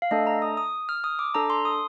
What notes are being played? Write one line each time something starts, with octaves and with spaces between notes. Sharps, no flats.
F5
A3 D4 A4 D#5
A#5
D#6
D#6
F6
D#6
D6
D4 A4 A#5
C6
D#6